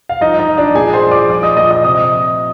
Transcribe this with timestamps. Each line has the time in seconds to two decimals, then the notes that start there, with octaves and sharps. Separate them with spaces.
0.09 F5
0.21 F3 D#4 D#5
0.39 D#4 D#5
0.48 F3
0.57 D4 D5
0.75 A#2 G#4 G#5
0.93 C5 C6
1.02 F3
1.11 D5 D6
1.30 F3 D5 D6
1.43 D#5 D#6
1.56 A#2 D#5 D#6
1.71 D#5 D#6
1.84 C3 D#5 D#6
2.11 F3